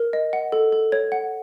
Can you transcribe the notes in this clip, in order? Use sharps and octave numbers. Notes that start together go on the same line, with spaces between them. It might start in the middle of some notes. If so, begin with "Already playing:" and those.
Already playing: A#4
D#5
F#5
A4
A4
C#5
F#5